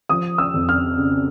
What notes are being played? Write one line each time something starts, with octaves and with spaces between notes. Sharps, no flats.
F3 D#6
E6
F2
F6
C#3